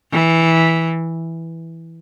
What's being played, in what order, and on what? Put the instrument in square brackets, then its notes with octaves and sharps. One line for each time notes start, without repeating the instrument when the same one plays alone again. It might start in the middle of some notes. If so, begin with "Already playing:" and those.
[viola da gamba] E3